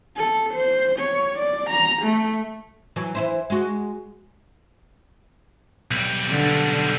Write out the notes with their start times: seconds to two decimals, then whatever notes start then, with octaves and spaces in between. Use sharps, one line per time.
0.17 A4
0.54 C5
1.00 C#5
1.39 D5
1.70 A#5
2.02 A3
2.96 E3 F#3
3.15 E3 E4 C5
3.50 G#3 F#4
5.91 B1 G3
6.31 D3